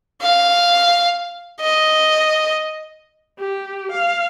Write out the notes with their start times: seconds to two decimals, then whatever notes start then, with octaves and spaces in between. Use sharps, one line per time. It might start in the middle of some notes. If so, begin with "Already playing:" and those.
0.22 F5
1.61 D#5
3.39 G4
3.92 F5